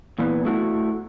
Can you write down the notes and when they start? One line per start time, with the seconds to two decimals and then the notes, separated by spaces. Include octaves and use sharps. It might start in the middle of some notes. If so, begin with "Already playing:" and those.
0.19 A#2 E3 B3
0.45 A3 E4 F#4